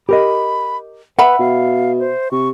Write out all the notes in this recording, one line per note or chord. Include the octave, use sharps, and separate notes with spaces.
G4 A#4 D#5 B5
B4 E5 F#5 B5
B2 F5
C5
C3 C#6